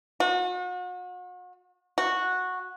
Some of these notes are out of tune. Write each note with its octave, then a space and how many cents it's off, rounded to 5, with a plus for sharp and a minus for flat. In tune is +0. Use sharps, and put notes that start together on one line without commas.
F#4 -40
F#4 -10